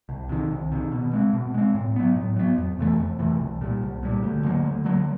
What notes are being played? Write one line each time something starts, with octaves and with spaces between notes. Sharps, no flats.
C2
C3 D#3
C2
C3 D#3
B2
G#3 C4
B2
G#3 C4
A2
F#3 B3
A2
F#3 B3
F2
C3 E3 A3
F2
C3 E3 A3
C2
A#2 G3
C2
A#2 G3
D2
D3 F#3 A#3
D2
D3 F#3 A#3